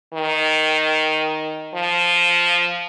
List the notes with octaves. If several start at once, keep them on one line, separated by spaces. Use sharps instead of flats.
D#3
F3